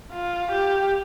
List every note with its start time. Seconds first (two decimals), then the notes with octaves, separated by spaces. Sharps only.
0.12 F4
0.51 G4